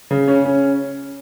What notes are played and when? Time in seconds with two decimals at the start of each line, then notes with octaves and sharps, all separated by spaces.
0.11 C#3
0.28 C#4
0.45 C#4